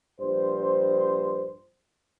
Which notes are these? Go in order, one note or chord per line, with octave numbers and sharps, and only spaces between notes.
A#1 G2 C5